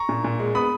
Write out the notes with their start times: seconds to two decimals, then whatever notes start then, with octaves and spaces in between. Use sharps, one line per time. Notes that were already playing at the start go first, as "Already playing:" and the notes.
Already playing: A#5 C#6
0.09 A#2
0.24 A#2
0.39 G#3
0.55 B3 B5 D#6